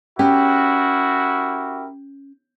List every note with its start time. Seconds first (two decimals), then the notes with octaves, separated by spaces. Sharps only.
0.19 C#4 E4 F#4 G4 A#4